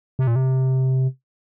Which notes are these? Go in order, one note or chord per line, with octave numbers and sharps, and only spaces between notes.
C3
A#2
C3